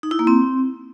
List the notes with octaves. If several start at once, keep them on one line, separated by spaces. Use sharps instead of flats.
D#4
E4
A#3
C4